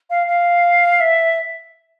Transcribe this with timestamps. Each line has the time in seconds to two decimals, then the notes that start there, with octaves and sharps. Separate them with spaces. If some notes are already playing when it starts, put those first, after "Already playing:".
0.10 F5
0.27 F5
1.00 E5